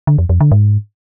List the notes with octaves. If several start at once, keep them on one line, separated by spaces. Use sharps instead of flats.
D3
F2
F2
D3
G#2